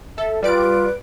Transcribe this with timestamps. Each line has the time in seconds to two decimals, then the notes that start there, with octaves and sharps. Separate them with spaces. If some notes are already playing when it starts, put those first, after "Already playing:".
0.18 A4 E5
0.43 G3 F4 B4 D5 D7